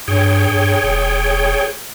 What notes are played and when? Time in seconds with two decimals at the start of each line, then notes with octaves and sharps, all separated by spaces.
0.08 G2 G#4 C#5 G5
0.48 G2
0.83 E1